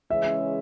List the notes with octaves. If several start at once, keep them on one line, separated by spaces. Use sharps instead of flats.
C#3 E3 G#3 C#4 E5